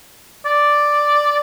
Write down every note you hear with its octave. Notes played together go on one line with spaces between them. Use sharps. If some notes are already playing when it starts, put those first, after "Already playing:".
D5